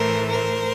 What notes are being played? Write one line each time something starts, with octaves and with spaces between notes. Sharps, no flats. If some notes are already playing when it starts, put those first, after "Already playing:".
Already playing: A2 E3 A3 A#4 C5
A#4 C5